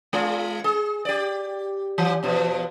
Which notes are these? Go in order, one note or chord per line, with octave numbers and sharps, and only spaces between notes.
G#3 F4
G#4
G4 D5
E3
E2 B2 F3